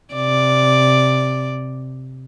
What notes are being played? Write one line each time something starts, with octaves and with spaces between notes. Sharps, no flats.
C3 D5